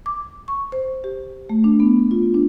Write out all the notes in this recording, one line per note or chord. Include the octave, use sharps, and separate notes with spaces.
D6
C#6
C5
G4
A3
D4
B3
F4
D4